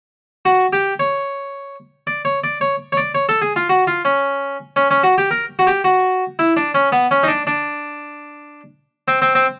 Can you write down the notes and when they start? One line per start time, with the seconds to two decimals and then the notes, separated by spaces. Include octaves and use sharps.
0.45 F#4
0.73 G4
1.00 C#5
2.07 D5
2.25 C#5
2.44 D5
2.61 C#5
2.92 C#5
2.97 D5
3.15 C#5
3.29 A4
3.42 G#4
3.56 F4
3.69 F#4
3.87 F4
4.05 C#4
4.76 C#4
4.91 C#4
5.03 F#4
5.18 G4
5.31 A#4
5.59 F#4
5.67 G4
5.84 F#4
6.39 E4
6.57 D4
6.75 C#4
6.92 B3
7.11 C#4
7.23 D#4
7.28 D4
7.47 D4
9.08 C4
9.22 C4
9.35 C4